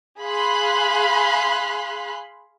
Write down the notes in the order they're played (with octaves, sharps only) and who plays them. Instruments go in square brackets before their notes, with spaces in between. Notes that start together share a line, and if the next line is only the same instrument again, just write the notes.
[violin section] G#4 F5 B5 C6 F#6